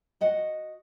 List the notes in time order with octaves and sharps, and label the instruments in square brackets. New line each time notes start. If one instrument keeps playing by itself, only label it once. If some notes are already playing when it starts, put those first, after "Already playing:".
[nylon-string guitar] F#4 D#5 F#5